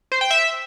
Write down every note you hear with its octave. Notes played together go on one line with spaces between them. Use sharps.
C5
G5
E5